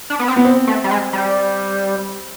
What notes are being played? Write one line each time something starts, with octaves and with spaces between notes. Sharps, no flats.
D4
B3
C4
B3
C4
A3
G3
G#3
G3